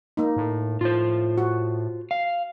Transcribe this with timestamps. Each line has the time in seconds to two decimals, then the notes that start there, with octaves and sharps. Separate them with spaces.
0.17 A#3 D#4
0.36 A2
0.81 A2 F4 C5
1.38 F#4
2.11 F5